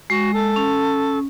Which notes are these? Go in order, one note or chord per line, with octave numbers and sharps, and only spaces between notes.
G#3 F#4
A4
C#4